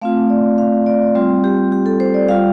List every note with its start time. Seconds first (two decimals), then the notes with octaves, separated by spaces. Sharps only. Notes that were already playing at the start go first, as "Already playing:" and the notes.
0.02 A3 C4 F4 F5
0.30 D5
0.58 F5
0.86 D5
1.15 G3 C4 F4
1.44 G4
1.72 G4
1.86 A4
2.00 C5
2.14 D5
2.29 G3 F4 F5